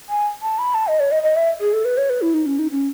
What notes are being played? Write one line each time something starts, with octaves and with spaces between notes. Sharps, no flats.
G#5
A5
B5
A5
D#5
C#5
D#5
D#5
E5
G#4
A4
B4
C#5
B4
E4
D#4
C#4
D#4
C#4